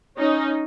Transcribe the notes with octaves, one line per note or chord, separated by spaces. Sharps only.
C#4 D#4